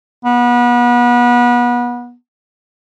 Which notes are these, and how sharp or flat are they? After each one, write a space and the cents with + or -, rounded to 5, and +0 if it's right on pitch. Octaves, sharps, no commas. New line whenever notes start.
B3 -30